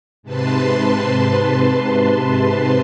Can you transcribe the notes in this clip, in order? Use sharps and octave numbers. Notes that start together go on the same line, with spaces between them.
G#2 C3 B4 A5 C6